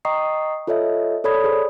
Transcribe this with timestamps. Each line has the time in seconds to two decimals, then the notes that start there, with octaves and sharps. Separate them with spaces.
0.05 D#5 G5 A#5 C#6 D#6 C7
0.67 F4 A4 C#5 D#5 E5
1.24 A4 C#5 D5 B5 D#6 G#6
1.44 G#4 C5 D5